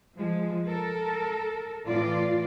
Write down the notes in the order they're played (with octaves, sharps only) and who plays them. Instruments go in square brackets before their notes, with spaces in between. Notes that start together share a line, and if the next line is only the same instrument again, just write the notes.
[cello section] F3 G#3
A4 A#4
A2 E3 F4 D5